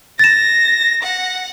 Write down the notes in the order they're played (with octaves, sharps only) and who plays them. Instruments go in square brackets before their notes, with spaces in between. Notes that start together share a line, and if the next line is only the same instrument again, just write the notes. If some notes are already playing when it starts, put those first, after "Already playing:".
[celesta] A6 E7 [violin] A#6
[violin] F#5